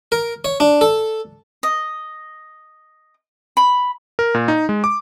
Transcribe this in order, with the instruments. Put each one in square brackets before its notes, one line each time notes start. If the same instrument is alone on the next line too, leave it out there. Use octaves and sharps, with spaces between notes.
[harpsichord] A#4
C#5
D4
A4
[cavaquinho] D#5
B5
[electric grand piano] A#4
A#2
D#4
G#3
D6